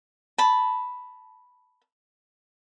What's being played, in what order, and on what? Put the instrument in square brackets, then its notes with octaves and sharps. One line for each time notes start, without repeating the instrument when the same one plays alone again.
[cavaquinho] A5 B5